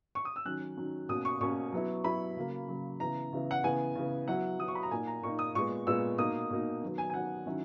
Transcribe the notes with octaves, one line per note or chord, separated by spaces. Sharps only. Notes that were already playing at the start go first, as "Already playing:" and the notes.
C#6
D#6
E6
D#3 F#3 C#4 F#6
D#3 F#3 C#4
B2 A#3 C#4 D#6
C#6
B2 A#3 C#4 C#6
F#3 B3 E4
F#3 B3 E4 B5
C#3 F#3 A#3
C#3 F#3 A#3
C#3 E3 B3 E4 A#5
C#3 E3 B3 E4
F#5
C#3 E3 B3 G#5
C#3 E3 B3
F#3 B3 E4 F#5
F#3 B3 E4 D#6
C#6
B5
A#5
A#2 A#3 D#4 G#5
A#5
A#2 A#3 D#4 C#6
D#6
A#2 G#3 B3 C#6
A#2 G#3 B3 E6
B2 A#3 D#4 D#6
B2 A#3 D#4
D#3 F#3 B3
G#5
G#5
D#3 F#3 B3 F#5
D#3 F#3 C#4 E4